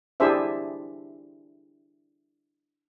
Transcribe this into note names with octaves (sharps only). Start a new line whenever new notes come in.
D4 E4 G4 G#4 C5 E5